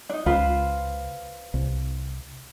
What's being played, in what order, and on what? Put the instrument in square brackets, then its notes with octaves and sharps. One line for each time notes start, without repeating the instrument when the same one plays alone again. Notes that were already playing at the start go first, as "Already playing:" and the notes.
[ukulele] D4 D#4
[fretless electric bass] C#2 [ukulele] F4 B4 C5
[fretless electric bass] C2